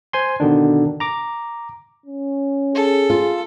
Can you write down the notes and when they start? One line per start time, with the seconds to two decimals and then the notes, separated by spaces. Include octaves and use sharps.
0.13 C5 G#5 C6
0.40 B2 D3 D#3 D4
1.00 A#5 D6
2.06 C#4
2.75 G#4 A4
3.10 F4